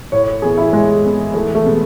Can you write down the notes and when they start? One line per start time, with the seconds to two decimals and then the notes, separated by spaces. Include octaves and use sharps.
0.12 A2 C#5
0.42 E3 B3 G#4
0.58 E4
0.73 A2 G#3
1.03 E3 B3
1.34 E2 A3
1.55 A3
1.65 B2 G#3 B3